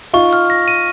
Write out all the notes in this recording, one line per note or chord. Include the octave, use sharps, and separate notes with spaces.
D#4 F4 C#6
F6
A#6
D#7